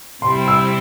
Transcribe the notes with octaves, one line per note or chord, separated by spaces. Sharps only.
C3 G3 C4 E4 C6
E6